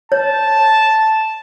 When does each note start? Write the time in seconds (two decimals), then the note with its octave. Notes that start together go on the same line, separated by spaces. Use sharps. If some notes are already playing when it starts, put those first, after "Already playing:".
0.12 C#5 A5